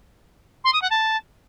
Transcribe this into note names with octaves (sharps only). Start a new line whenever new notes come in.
C6
D#6
F#5
A5